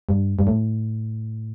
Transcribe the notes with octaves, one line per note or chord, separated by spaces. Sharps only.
G2
G2
A2